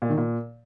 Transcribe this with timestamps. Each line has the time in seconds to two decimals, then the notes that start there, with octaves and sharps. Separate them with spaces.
0.02 A#2
0.10 D#3
0.18 A#2